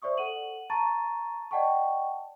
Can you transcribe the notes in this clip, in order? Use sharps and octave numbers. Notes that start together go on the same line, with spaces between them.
C5 D5 E5 C#6 D#6
A4 F#5 D#7 F#7
A5 A#5 C#6 A6 D#7
D5 D#5 F#5 G5 A5 C#6